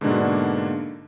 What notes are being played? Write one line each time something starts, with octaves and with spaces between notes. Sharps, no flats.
G#2 B2 D3 A#3 D4 F#4